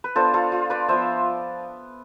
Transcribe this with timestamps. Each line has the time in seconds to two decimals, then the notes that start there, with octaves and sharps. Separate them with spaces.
0.04 B4
0.15 B3 D4 F4 A4 C5
0.34 F4 A4
0.52 F4
0.70 B4 D5
0.88 F3 B3 F4 C5 E5